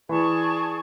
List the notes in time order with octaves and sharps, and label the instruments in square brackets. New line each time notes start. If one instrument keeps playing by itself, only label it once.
[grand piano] E3 [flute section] G#4 D5 A5 C#6